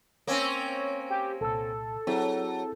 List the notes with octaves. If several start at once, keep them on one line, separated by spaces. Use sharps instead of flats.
A#3 C4 C#4 C#5
G4
C2 A#2 A4 E6
F#3 C4 E4 G#4